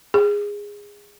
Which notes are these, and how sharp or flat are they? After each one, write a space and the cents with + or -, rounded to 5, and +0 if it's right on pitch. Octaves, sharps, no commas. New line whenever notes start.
G#4 -15